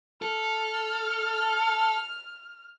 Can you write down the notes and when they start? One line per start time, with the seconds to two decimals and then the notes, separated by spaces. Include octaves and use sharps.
0.22 A4 F6